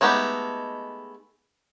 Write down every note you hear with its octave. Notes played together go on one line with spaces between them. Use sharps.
G#3 A3 B3 D#4 G4